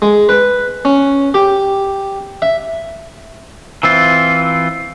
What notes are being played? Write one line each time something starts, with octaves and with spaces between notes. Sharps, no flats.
G#3
B4
C#4
G4
E5
E3 C4 F4